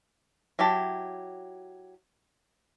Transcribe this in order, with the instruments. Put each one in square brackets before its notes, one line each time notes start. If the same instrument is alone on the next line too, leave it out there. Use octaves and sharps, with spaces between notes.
[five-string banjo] F#3 E4 G4 A5